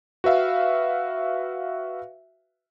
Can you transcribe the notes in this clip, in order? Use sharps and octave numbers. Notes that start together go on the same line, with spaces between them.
F#4 B4 E5 F5